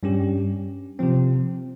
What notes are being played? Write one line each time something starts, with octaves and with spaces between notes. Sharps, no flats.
G2 G3 C#4 G4
C3 F3 C4